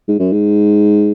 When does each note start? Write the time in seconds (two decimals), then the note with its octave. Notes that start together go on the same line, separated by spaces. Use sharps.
0.08 G#2
0.19 F#2
0.32 G#2